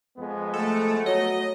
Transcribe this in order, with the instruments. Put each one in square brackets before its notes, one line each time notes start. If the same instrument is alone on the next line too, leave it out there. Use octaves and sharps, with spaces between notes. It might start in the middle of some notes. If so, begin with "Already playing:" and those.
[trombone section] F2 G#3 B3
[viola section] A3 [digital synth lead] A4
[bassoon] F#3 [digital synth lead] D#5